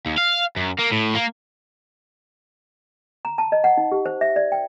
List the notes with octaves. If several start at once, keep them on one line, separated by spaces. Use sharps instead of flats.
D#2
F5
F#2
A#3
A2
A#3
A#5
A5
D#5
F#5
D#4
G4
C5
E5
D5
G5